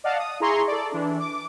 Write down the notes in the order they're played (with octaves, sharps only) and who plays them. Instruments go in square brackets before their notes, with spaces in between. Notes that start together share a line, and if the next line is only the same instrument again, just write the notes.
[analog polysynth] D5 D#5 F5 F#5 A5
D#6
E4 G#4 A#5 C6 C#6
A4 D5
E3 D4
D6